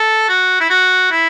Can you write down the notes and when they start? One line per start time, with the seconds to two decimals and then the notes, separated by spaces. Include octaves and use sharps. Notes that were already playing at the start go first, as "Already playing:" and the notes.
Already playing: A4
0.29 F#4
0.61 E4
0.70 F#4
1.11 E4